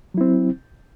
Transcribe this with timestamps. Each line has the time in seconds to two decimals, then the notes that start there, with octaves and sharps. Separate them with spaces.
0.14 F#3
0.18 E4
0.21 C4